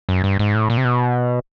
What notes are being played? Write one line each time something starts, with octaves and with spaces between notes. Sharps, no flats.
F#2
G2
G#2
A2
A#2
C3
B2